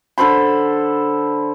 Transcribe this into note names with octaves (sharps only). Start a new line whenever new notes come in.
D3 A4 C5 B5